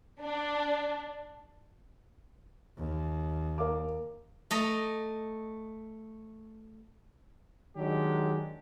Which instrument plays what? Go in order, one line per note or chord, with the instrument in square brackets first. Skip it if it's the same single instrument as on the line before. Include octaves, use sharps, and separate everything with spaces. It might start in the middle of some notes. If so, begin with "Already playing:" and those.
[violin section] D4
[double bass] D#2
[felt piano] A#4 F5 D6
[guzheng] A3 D#5 A#5
[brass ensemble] D#3 F#3 G#3 D4 G4